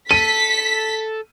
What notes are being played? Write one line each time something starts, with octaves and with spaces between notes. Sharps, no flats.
A4 B6 D#7